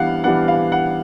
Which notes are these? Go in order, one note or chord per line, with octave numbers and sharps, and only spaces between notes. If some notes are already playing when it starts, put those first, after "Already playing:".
Already playing: E3 G3 B3 D4 F5 F#5
E3 G3 B3 D4 F#5
F5
F#5